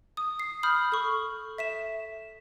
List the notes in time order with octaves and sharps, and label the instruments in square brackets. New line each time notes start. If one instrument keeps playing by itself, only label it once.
[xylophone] D#6
C7
B5 D#6 F6 G6
A4 C#6
E5 B6 E7